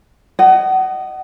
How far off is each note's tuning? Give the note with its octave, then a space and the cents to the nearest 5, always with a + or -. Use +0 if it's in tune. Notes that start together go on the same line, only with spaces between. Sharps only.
D#5 -10 F#5 +30